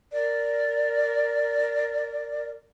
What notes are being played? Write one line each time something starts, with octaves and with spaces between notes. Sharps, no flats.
A#4 D5